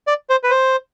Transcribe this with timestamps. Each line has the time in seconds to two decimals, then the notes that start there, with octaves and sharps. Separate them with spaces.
0.07 D5
0.30 C5
0.43 B4
0.50 C5